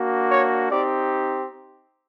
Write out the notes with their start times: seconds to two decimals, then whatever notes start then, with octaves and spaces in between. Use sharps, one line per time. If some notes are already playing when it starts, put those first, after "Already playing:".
Already playing: A#3 D4 F#4
0.29 C#5
0.69 C4 D#4 G4 D5